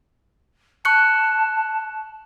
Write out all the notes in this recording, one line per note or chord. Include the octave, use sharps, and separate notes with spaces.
A5 C#6 F#6 C#7